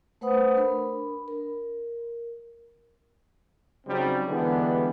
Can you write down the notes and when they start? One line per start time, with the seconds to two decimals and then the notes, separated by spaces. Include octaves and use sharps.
0.21 A3 B4 C5 F#5 B5 D#6
0.57 D4 A#4 B5
1.28 A#4
3.87 C#3 F#3 G3 C4 D#4
4.28 D3 E3 G3 G#3 B3